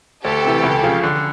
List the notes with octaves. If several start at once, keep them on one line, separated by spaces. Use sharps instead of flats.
D2 G4 A4
C3 E3
C#2
C#3 F3
D3